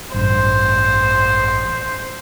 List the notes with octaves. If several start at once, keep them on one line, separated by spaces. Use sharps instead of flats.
A1 G2 C5